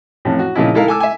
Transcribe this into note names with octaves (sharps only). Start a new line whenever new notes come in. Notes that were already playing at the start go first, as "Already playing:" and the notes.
A1 F2 A2
F#4
A#2 C#3 F3 D#4 E4
G#3 D#4 E4 A4 A#4 F5
A4 G#5 D6 E6
E5 G#5